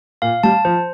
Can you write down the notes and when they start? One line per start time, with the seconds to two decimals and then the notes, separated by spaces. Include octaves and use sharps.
0.22 A#2 F5
0.43 G3 A5
0.65 F3 C5